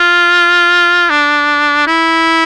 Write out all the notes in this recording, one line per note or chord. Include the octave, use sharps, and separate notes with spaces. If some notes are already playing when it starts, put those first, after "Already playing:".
Already playing: F4
D4
E4